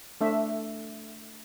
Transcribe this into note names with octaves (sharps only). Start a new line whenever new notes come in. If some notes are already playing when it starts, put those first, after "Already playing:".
A3 D4 E5